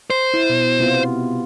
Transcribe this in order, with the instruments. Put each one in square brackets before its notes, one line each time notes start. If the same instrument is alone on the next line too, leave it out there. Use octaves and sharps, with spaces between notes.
[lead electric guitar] C5
[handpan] E4
B2
C3 B3 F4